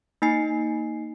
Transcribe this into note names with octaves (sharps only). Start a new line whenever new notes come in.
A#3 D#4 G#5 C7